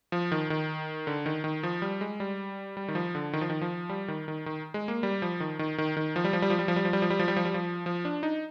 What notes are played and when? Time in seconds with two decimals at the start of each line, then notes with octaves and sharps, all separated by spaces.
0.12 F3
0.32 D#3
0.50 D#3
1.07 D3
1.26 D#3
1.44 D#3
1.63 F3
1.82 G3
2.01 G#3
2.20 G3
2.77 G3
2.88 D#3
2.95 F3
3.15 D3
3.33 D#3
3.41 F3
3.50 D#3
3.61 F3
3.89 G3
4.08 D#3
4.28 D#3
4.46 D#3
4.74 G#3
4.88 A#3
5.03 G3
5.22 F3
5.40 D#3
5.59 D#3
5.78 D#3
5.97 D#3
6.16 F3
6.24 G3
6.33 F3
6.42 G3
6.50 F3
6.59 G3
6.68 F3
6.76 G3
6.85 F3
6.93 G3
7.02 F3
7.10 G3
7.19 F3
7.28 G3
7.37 F3
7.45 G3
7.54 F3
7.86 F3
8.05 D4
8.23 D#4